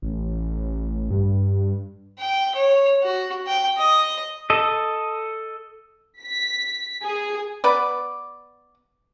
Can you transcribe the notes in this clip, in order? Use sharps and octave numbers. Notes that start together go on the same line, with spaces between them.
A1
G2
G5
C#5
F#4
G5
D#5
A4 D#5
B6
G#4
B3 B4 D5